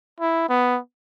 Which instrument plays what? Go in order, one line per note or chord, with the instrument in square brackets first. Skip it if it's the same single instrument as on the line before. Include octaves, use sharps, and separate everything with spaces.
[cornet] E4
B3